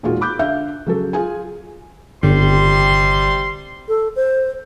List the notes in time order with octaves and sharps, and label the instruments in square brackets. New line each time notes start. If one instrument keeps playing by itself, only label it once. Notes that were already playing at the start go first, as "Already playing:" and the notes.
[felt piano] E1 A#2 G#3 D#4 F4 F#4
B5 D6 F#6 G6
D3 E5 F5 G6
C#3 F#3 A4
F4 G#4 G#5
[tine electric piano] G1 [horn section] C3 G3 C6
[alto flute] A4
C5